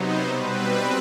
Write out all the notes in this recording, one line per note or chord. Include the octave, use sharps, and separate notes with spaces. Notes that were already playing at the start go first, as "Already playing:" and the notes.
Already playing: C3 F#3 B3 D#4 C5
B2 G3 C4 B4